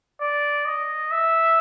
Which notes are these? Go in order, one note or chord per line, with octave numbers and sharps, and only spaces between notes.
D5
D#5
E5